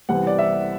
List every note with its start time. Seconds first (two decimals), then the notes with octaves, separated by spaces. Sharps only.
0.09 C2 C3 E3 B3 F#5
0.27 D5
0.39 E5